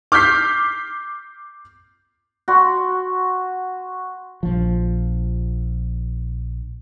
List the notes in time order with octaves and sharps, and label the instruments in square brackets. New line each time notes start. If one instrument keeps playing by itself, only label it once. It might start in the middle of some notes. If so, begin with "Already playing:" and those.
[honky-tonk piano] D6 F6 G6 B6 C7
[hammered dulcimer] F#4 C6
[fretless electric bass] A#1 F3